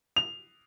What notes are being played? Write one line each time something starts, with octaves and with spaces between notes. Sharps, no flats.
F7